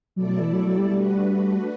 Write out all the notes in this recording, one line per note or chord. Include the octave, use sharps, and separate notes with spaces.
B2 F#3 A3 E4 A4 D5
F#3
E3
F#3
F#3
G3
G3 A3 D4 F#4 B4